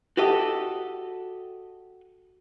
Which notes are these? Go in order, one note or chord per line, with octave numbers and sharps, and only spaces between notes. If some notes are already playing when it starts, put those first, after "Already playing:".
F#4 G4 A4 D#5